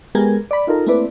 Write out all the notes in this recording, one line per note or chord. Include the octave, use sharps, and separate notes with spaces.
G#3 B3 G4 G#4 A#4 G#6
D5 B5
D#4 F4 A4 A#4
A3 A#3 C4 E4 B4 D5